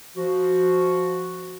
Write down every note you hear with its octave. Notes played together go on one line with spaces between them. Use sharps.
F3 F#4